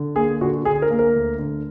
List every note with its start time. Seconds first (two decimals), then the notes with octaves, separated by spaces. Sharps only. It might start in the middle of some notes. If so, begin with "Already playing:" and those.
Already playing: D3
0.16 A#3 G#4
0.41 D3 F#4
0.65 D3 G#4
0.82 A#4
0.91 A#3
0.99 A#4
1.14 D2
1.39 D3